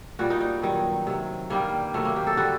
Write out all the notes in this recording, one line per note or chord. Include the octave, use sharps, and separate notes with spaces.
A#2 G3 F#4
D#4
D#4
G2 D#3 F#3
C3 F#3
G2 D#3 G3 A#3
C3 D#3 F#3 A3
A#3
G4
A4
D3 G3 F#4